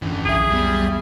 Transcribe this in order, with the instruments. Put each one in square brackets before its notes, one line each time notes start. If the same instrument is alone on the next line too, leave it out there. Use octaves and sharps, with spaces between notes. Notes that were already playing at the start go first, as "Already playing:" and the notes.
[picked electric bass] G1 F2 D3 [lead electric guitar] E3 C#4
[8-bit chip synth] B1 E5 [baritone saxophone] G#4
[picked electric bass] F2 B3 [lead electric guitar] G3